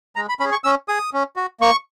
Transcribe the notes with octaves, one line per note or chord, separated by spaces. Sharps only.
G#3 A#5
B5
C#4 B5
G#4
C#6
C#4 E6
G#4 D#6
C#4
F#4
A#3 C#6